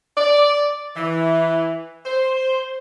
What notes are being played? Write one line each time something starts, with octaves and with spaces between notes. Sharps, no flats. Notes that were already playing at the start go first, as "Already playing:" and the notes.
D5
E3
C5